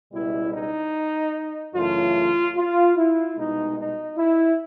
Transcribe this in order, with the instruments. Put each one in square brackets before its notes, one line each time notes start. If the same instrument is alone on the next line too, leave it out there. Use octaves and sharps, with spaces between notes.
[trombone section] C#2 B2 G3 E4
D#4
F#2 C#3 E3 A3 F4
F4
E4
C2 B2 G#3 D#4
D#4
E4